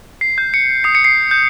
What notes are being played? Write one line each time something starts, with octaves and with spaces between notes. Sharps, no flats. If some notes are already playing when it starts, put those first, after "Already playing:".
C7
G6
C#7
D#6 C7
C#7
C7
G6